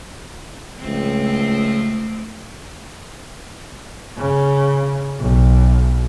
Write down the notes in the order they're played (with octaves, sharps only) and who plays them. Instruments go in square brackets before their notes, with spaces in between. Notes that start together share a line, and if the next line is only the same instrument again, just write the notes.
[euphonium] C#2 [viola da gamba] F3 A3 C4
[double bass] C#3
B1